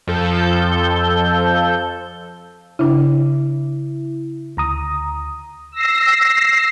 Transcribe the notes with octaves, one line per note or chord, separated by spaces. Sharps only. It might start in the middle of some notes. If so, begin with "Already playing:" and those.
F2 F3 A4 G6
C#3 D4 E4
D2 A#5 D#6
E6 A#6 C7